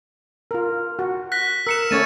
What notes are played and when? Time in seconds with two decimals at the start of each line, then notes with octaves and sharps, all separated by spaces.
0.51 F4 A#4
0.99 F#4
1.32 F#6 A#6 B6
1.67 A#4 E6 C#7 E7
1.91 A3 C#4 C#5 G#6 A6 D#7